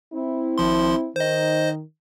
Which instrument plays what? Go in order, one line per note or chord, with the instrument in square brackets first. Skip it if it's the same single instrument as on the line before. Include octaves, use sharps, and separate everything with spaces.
[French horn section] C4 E4
[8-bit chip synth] G#1 F3 C6
[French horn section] D#3 [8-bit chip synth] C5 D#5